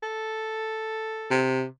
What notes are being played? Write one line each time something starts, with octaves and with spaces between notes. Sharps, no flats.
A4
C3